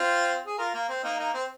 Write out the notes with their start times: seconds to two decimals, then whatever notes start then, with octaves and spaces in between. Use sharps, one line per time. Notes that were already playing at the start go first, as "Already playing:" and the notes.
Already playing: C4 F4
0.47 G#4
0.58 F4 A#4
0.74 A#3
0.89 C4
1.04 A#3 D#4
1.19 A#3 D#4
1.34 C4